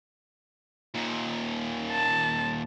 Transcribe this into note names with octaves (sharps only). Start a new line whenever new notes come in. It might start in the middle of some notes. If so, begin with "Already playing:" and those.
D#2 A#2
A5